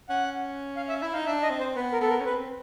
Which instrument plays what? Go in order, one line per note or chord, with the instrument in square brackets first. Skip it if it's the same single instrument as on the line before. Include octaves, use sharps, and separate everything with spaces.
[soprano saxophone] C#4 [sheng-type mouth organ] F#5
[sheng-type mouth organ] F5
E5
[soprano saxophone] E4 [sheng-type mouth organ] E5
[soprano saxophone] D#4 [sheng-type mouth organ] F5
[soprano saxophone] D4 [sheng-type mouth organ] E5
[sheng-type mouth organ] D#5
[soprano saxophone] C4
[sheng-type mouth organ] C5
[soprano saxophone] B3 [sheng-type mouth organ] B4
[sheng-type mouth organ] A#4
[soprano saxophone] B3 [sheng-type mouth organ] A4
[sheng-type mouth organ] A#4
[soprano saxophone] C#4
[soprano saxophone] C4 [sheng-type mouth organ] B4